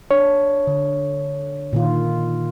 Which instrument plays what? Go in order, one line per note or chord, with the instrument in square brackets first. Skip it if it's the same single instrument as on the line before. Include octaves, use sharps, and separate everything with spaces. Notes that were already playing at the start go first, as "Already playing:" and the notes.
[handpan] D4 [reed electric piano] C#5
[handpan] D3
A#2 D#3 F4